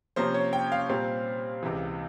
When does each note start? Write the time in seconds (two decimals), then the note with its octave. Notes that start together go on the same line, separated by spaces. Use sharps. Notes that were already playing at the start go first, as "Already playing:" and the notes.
0.16 C3 F3 A#3 C#4 C5
0.34 C#5
0.53 G5
0.72 F5
0.89 A#2 G3 C4
1.63 C#2 C3 E3